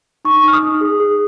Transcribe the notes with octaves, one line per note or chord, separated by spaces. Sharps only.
D#4 C#6
D#4 F6
D#6
D#4
G#4
G#4